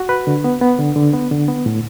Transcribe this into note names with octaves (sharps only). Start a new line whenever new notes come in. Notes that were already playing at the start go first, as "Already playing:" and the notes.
Already playing: F#4
B4
D3
B3
B3
D3
D3
B3
D3
B3
A2